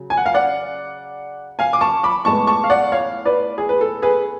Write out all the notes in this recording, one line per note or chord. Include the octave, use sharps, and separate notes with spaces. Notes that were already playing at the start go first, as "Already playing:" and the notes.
Already playing: C#3 F#3
G#5
F#5
F5
D5 F#5
F5 G#5
D6
A5 C#6
B5 D6
A2 G#3 B3 A5 C#6
A5 C#6
F5
D5 F#5
C#5 F5
B4 D5
G#4
B4
A4
G#4 B4